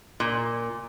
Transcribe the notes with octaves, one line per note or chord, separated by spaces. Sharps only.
A#2